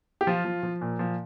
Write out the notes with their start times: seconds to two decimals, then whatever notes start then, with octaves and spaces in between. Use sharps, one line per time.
0.21 G4
0.27 F3 F4
0.45 F3
0.63 F3
0.81 A#2
0.99 F3